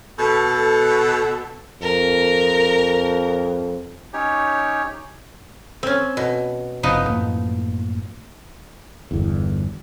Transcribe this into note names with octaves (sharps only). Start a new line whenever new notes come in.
B2 A4
F2 A#4
C#4 D#4 G4 C#5
C4 C#4
B2
F#1 C3 F3 B3 D#4
F#2 A2 A#3
G1 E2